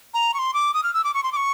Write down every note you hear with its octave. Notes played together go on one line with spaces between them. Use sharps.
A#5
C#6
C6
D6
D#6
F6
E6
D6
C#6
C6
D6
C#6